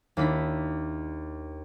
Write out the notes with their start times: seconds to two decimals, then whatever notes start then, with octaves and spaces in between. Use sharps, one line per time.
0.17 D#2 D4 E4 B6